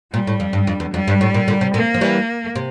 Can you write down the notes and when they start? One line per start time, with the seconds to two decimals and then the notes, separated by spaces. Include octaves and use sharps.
0.13 A#2 G3
0.27 A2
0.40 F2
0.53 G2
0.67 F2
0.80 E2
0.94 F2 G3
1.08 G2
1.21 A2
1.34 A#2
1.48 A#2 D3
1.61 C3
1.74 A#2 A#3
1.94 F3
2.01 E3 G3
2.55 C3